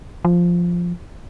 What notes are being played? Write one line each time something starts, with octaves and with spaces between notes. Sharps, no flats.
F3